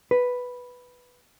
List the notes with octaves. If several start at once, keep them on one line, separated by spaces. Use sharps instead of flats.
B4